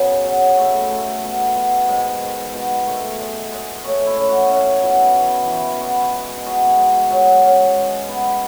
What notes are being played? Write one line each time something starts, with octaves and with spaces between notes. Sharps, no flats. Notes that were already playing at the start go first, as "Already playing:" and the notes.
Already playing: F#2 C#3 B3 D#5
F#3
A3 E5
A3
B2
B2
G#2 D#5
D#3
B2
A3
G#3
G#3
A3 C#5
E4
C#4
F#4
C#4
B2
E3
E3
B3 F#4
G#3
G#3 F#4
G#3
F#3
C#4
G#3
B3